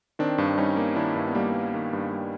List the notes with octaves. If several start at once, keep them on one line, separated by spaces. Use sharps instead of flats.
D#3 C4 D4
G2
G3 C#4 D#4
A#3
D#3 D4 E4
G2
B3
G3 A#3
A#3
D#3
G2
G3